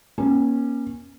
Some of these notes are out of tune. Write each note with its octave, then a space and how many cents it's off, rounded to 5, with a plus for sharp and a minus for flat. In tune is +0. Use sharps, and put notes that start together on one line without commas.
A#3 +30 C#4 -10